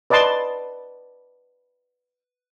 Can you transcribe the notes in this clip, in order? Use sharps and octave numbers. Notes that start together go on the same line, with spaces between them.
B4 D5 D#5 A5 C6